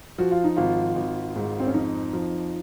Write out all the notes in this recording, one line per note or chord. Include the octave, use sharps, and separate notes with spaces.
F3 F#4
F4
D#4
G#1 F4
G#1
G#2
C4
C#4
F2 D#4
F3